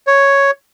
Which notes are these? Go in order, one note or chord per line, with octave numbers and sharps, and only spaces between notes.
C#5